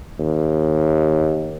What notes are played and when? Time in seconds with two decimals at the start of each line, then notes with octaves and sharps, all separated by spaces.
0.19 D#2